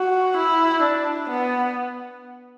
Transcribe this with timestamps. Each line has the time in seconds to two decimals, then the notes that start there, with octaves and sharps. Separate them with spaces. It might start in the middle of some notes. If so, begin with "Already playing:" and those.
Already playing: F#4
0.37 E4
0.83 D4
1.29 B3